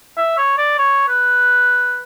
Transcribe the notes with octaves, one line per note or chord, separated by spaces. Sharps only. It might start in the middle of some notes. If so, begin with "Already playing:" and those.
E5
C#5
D5
C#5
B4